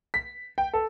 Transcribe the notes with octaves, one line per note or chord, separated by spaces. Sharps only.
B6
G5
A4